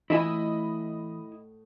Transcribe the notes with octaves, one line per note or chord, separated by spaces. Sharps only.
A2 E3 E4 D#5 E5 F#5 G#5 B5